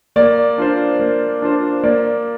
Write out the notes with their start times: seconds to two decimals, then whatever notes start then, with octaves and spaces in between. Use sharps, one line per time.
0.16 A#3 D5
0.58 D4 F4 C5
1.00 A#3
1.42 D4 F4 C5
1.83 A#3 D5